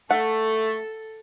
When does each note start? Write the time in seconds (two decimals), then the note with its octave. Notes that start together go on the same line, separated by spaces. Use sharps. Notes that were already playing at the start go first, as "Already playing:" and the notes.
0.11 A3 A4 F#5